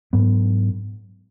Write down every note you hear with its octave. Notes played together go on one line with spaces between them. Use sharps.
G#2 F#3 B3 D4